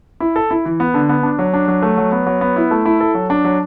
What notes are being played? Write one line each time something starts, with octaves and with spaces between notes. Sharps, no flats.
E4
A4
E4
E3
B3
D3
B3
D4
F#3
D4
F#3
A3
F#3
B3
F#3
B3
E4
A3
E4
A4
F#3
D4
F#3